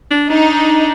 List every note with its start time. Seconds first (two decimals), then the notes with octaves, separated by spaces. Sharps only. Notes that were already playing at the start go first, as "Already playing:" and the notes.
0.11 D4
0.30 D4 D#4